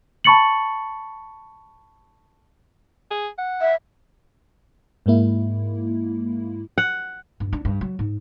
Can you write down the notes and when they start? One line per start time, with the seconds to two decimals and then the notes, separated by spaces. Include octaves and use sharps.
0.24 A5 B5 C#6 A6 C#7 F#7
3.11 G#4
3.38 F#5
3.61 E5
5.06 G#2 G#3 A#3 E4
6.78 F#5
7.40 G2
7.53 D4
7.65 G2
7.81 F#3
7.99 G#2